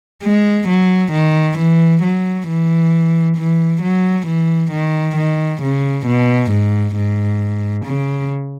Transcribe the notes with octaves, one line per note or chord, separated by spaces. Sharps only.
G#3
F#3
D#3
E3
F#3
E3
E3
F#3
E3
D#3
D#3
C#3
B2
G#2
G#2
C#3